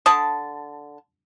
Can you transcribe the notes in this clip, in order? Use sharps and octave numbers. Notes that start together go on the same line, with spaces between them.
D3 A5 D#6